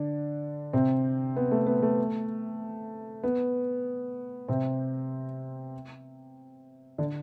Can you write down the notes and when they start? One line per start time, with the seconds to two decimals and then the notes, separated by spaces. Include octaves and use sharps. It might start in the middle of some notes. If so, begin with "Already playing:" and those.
Already playing: D3 D4
0.73 C3 C4
1.36 B3
1.51 A3
1.67 B3
1.83 A3
3.24 B3
4.48 C3 C4
6.98 D3 D4